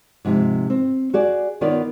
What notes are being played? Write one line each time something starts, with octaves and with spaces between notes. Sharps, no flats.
G#2 C3 F3
C4
F#4 G#4 D5
D#3 B3 F4 A#4 C#5 D5